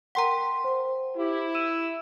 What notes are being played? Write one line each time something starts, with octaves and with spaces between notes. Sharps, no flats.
A#4 F#5 G5 A#5 C6 B6
C5
E4 G4
E6 D#7